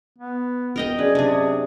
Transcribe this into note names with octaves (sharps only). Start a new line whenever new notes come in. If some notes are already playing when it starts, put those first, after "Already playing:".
B3
E1 A#4 D#5 G5
F#2 G#4 B4 D5
C3 D4 G#4